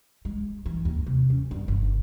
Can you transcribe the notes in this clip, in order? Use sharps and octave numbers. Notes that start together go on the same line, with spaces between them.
G#3
E3
D#2
C3
C#4
G1
G1